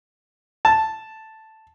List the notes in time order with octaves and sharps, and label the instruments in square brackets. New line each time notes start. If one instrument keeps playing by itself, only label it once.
[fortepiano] A5